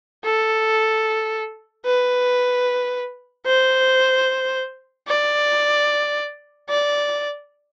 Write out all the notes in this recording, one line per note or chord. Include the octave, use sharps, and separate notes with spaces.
A4
B4
C5
D5
D5